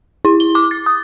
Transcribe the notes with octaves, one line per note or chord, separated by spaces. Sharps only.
E4
G7
D6
A6
D#6